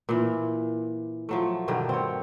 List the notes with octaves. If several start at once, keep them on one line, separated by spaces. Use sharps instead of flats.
A#2 E3
F3 F#3 A3
G2 B2 D3 D#3
C4 C#5